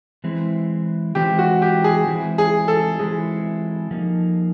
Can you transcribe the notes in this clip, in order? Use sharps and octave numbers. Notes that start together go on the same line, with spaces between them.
E3 G#3 C4 E4
E3 G#3 C4 E4 G4
F#4
G4
G#4
E3 G#3 C4 E4
G#4
A4
E3 G#3 C4 E4 G#4
F3 A#3 D#4